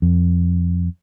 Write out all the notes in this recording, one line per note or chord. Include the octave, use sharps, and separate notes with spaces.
F2